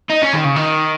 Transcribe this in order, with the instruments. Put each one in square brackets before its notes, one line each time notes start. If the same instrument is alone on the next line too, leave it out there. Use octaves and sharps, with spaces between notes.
[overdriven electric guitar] D#4
C#4
D#3
C#3
D#3